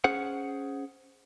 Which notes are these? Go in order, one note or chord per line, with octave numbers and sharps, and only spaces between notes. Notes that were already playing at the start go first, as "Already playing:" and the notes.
C#4 G#4 C5 F#5